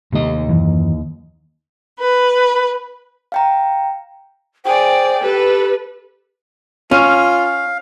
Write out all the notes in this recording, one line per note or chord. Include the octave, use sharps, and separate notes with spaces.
D#2 C3 A3 D#5
F#2 E3
B4
F5 G5 A#5
G#4 C5 D5 G5
G4 A4 B4
C#4 F4 F5